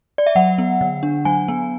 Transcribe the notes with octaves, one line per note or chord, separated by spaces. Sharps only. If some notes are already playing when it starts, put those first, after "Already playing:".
D5
E5
F#3 F#5
B3
D3
D4
F#3 G#5
B3